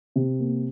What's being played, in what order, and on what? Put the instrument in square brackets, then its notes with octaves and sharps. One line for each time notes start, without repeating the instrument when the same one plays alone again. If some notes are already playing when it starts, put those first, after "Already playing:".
[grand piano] C3
A#3